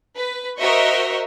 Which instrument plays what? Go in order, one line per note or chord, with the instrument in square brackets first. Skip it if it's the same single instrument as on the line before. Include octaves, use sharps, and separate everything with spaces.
[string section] B4
F#4 A#4 C5 D#5 E5 C#6